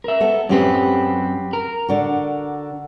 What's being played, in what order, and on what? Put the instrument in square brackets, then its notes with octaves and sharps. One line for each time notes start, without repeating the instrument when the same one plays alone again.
[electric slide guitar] A#4 E5
[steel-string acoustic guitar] B3 A4
[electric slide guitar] F#2 C4 [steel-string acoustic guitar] F#3 G4 B4
[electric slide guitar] A#4
[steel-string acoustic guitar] D3 D4 F#4